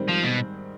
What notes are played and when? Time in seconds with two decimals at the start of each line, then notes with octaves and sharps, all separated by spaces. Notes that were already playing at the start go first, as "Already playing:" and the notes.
Already playing: G#2 D#3 G3 C4
0.09 F3
0.24 B2